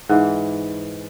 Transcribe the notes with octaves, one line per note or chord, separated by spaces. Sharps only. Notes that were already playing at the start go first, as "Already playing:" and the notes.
G#2 E3